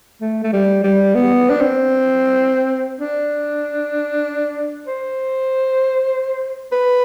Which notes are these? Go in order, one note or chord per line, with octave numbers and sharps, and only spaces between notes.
A3
A3
G3
G3
B3
D4
C4
D4
C5
B4